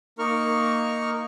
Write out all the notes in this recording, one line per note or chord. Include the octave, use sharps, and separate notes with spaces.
A#3 D#4 A#4 C#6 F6